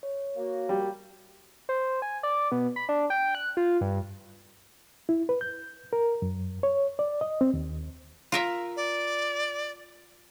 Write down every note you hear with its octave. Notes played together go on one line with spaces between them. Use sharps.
C#5
A#3 F#4
G3
C5
G#5
D5
B2
B5
D4
G5
F#6
F4
G2
E4
B4
G6
A#4
F#2
C#5
D5
D#5
C4
D#2
F4 A#4 E5
D5